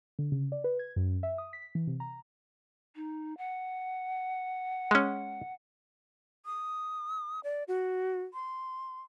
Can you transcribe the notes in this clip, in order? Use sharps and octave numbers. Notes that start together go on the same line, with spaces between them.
D3
C#3
D5
B4
G#6
F#2
E5
D#6
B6
E3
C3
A#5
D#4
F#5
G#3 C#4
D#6
D5
F#4
C6